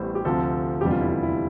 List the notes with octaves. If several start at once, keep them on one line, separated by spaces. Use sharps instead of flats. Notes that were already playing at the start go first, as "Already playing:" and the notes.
Already playing: A1 A2 G3 B3 C5
G4
D2 C3 F3 A4
F1 E2 D3 G3 G4
F4
E4
F4
E4